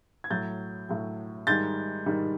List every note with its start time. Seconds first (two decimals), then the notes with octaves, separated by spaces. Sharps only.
0.24 G#6
0.30 A2 F#3 G6 A6
0.89 A2 F#3
1.47 G#2 D#3 G3 G6 A6
2.06 G#2 D#3 G3